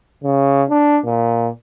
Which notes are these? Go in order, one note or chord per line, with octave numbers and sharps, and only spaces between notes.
C#3
D4
A#2